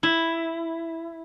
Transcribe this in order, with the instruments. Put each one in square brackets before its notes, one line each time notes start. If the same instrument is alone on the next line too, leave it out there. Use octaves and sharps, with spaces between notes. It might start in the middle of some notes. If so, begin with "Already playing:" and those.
[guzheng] E4